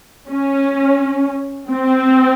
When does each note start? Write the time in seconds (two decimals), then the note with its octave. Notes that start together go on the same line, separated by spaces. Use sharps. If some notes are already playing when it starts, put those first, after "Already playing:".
0.30 C#4
1.70 C4